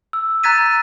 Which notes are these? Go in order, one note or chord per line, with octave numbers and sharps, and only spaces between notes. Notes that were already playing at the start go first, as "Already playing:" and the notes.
E6
A#5 F#6 G#6 A6 B6 D#7